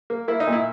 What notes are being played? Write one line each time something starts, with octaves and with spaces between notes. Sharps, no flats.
A#3
A#3 E4
D#4
A#2 E4